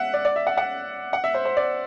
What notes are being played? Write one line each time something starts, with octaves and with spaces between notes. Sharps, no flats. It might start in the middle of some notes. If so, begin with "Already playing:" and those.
Already playing: E5 F#5
D5
D5
E5
F#5
F#5
F#5
E5
C5
C5
D5